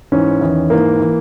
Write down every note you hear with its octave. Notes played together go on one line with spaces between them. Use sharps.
G#2 E3 C#4
E2 D#3
G#2 E3 A#3
E3